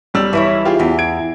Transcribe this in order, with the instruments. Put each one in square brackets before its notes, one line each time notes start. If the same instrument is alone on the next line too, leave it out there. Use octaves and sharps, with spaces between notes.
[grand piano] B1 G3 E6
[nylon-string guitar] E3 E4 C#5
[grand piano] F4 G4 G#4
[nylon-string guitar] E2
[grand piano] G#6 D7